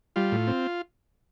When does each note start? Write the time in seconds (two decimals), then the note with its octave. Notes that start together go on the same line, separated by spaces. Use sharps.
0.16 G3 F4
0.32 A2
0.47 C4